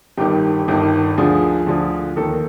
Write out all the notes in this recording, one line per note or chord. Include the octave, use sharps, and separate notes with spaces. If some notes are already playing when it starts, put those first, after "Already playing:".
G1 G2 D#3 G4
G1 G2 D#3
D2 D3 F3 G#4
D2 D3 F3
D#2 D#3 A4